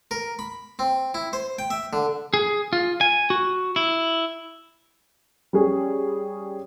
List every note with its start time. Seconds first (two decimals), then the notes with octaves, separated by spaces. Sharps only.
0.11 A#4
0.39 B5
0.79 C4
1.14 E4
1.33 C5
1.59 G5
1.70 E5
1.93 D3
2.34 G#4
2.73 F4
3.01 G#5
3.30 F#4
3.76 E4
5.53 G3 C#4 G#4 C#5